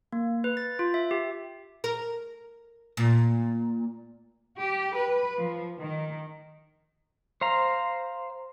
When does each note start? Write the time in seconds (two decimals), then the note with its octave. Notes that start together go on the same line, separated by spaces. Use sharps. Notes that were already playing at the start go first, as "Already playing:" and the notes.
0.12 A#3
0.44 B4
0.57 A6
0.79 F4
0.94 E5
1.11 G4
1.84 A#4
2.97 A#2
4.60 G4
4.95 B4
5.38 F3
5.79 D#3
7.41 C5 F5 A#5